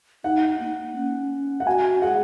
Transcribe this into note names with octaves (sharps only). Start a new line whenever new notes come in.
D#4 F#5
A#3
C#4
F#5
F#4 G#5
G#4 F#5